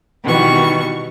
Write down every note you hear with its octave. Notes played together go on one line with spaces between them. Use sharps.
B2 D#3 E3 G3 C#6